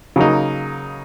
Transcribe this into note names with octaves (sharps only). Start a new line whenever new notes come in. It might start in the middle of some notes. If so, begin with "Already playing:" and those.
C#3 F#3 A#3 D#4